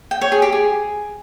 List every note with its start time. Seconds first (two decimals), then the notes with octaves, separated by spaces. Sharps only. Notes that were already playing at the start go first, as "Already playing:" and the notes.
0.11 G5
0.21 C#5
0.32 G#4
0.42 G4
0.52 G#4